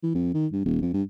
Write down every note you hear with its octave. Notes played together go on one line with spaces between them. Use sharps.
E3
F2
D#3
G2
D#1
F2
G2